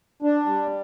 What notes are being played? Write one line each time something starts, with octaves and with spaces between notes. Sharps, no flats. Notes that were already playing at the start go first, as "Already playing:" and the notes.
D4
G3